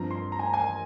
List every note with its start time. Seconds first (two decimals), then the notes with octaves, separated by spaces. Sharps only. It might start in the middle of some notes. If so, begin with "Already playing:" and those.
Already playing: G2 F3 C4 A#5
0.11 C6
0.32 A#5
0.39 G#5
0.46 A#5
0.54 G#5